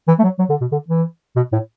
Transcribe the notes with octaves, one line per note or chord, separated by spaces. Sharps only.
E3
A3
F#3
F#3
D3
B2
D3
E3
B2
A2